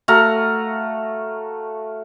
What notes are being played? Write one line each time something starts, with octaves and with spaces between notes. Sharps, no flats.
A3 F#4 F5 A#5